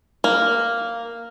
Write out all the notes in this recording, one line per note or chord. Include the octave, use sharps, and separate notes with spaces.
A#3